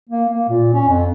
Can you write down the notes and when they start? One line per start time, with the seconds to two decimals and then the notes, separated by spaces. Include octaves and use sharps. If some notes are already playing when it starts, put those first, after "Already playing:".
0.10 A#3
0.29 A#3
0.49 A#2
0.74 C#4
0.88 F2